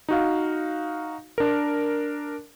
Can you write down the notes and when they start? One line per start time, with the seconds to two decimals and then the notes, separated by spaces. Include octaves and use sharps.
0.09 D#4 F#4 F5
1.38 D4 A#4